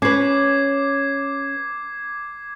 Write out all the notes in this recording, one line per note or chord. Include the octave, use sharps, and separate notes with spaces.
C#4 B4 D6 G#6 C7